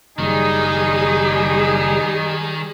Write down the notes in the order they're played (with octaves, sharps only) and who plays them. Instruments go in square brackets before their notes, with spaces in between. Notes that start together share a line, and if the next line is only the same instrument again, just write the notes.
[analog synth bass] F#1 [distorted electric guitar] D#3 [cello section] G3 G#4 [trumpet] D#4